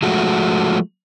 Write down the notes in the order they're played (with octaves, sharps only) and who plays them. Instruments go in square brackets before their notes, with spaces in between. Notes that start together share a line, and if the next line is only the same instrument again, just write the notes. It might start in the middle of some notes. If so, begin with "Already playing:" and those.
[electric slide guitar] F3 G#3 A3 F#4